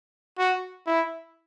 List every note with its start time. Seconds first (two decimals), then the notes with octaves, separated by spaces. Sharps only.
0.38 F#4
0.87 E4